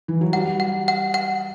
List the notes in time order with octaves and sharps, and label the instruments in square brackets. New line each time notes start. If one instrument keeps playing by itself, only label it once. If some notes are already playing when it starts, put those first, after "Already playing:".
[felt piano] E3
F#3
[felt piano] G3 [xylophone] F#5
[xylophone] F#5
F#5
F#5